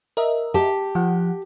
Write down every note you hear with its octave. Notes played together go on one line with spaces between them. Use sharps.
A#4 D#5 E5
G4 A5
F3 F#5